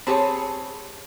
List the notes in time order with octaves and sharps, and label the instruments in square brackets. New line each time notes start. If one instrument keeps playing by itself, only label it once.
[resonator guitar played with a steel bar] C4 G#4 C#5 [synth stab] G4 A5 B5